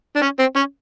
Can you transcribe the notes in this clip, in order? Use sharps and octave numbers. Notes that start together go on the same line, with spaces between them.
D4
C#4
C4
C#4